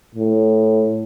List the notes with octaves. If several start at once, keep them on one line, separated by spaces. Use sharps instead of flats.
A2